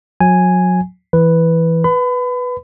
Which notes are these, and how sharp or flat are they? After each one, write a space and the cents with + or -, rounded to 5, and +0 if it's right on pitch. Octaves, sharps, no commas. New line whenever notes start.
F#3 -30 G#5 +0
E3 +0 B4 +0
B4 +0 B5 +35